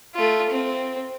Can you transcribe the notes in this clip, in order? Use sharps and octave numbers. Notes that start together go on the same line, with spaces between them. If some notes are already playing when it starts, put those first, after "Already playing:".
A3 F4
C4